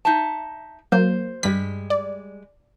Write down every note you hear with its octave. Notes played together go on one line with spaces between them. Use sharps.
D#4 E5 A5
F#3 A#3 C5
G2 G3 G#3 B6
D5